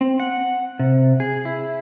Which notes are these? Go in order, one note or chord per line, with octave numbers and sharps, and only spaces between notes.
C4
F#5
C3
G#4
E4